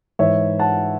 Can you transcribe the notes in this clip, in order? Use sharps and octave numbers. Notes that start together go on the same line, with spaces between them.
G#2 E3 C#5 E5
F#5 A5